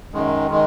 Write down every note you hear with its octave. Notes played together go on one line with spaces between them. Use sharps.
F#2 D#3 G#3
D#3 G#3